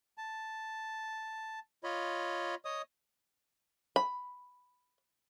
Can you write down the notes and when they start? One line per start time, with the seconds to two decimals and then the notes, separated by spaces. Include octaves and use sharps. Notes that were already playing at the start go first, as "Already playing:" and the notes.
0.18 A5
1.84 F4 C#5 D#5 B5
2.65 C#5 D#5 D#6
3.96 B5